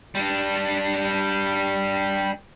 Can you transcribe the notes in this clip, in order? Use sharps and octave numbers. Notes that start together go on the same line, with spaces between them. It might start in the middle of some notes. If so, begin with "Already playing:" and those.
G3 D4